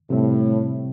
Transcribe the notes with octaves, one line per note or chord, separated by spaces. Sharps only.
A2 C3 G3 C4